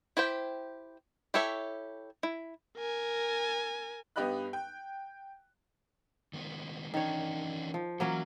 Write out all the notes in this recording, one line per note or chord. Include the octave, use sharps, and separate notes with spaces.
E4 G4 C5 G5
E4 G4 A4 C#5 E5
E4
A#4 G#5
G2 B3 G4 D#5 B5 F#6
G5
D#3 G#3 B3
D#3 E3 C#4 D4 C#5
F3
E3 F#3 A#3 C#4